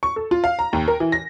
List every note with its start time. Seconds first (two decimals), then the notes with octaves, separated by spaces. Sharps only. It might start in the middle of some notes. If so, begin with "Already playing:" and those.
0.03 C#6
0.16 A4
0.31 F4
0.44 F5
0.59 A#5
0.73 D#2
0.88 A#4
1.00 E3
1.12 A#6